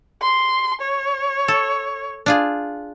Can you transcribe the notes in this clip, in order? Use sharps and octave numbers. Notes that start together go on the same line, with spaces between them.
C6
C#5
A4
D4 F4 G#4